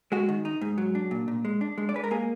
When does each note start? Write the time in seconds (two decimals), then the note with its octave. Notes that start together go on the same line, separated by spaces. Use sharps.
0.12 G#3 F#4
0.29 D#3
0.45 D#4
0.61 G#2
0.78 F#3
0.95 D4
1.11 A#2
1.28 A#2
1.45 G#3
1.61 D4
1.78 G#3
1.89 D5
1.94 G#3 B4
2.04 A#4
2.11 A#3 G#4